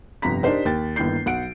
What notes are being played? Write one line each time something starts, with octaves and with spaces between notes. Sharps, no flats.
G1 F2 C3 A#5 B6
D4 D#4 G4 A#4 C5 D#5
D#2 G5 A6
G1 D#3 A#3 E4 G6 C7
B1 F#5 D7